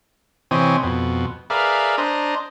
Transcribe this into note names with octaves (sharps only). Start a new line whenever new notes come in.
C3 E3 C4 C#5 D#5 G#5
F2 B2
G#4 A#4 B4 D5 E5 F5
D4 C5 D#5 A#5